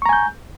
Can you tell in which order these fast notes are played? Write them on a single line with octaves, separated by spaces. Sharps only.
C#6 A#5 G#5 G6